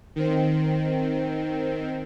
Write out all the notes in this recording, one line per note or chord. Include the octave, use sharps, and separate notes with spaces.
D#3 C4